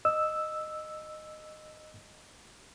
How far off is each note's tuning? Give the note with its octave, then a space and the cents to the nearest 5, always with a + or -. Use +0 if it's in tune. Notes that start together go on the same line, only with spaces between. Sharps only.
D#5 -10 E6 +0